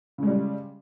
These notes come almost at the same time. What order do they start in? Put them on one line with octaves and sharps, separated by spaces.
C#3 G#3 G3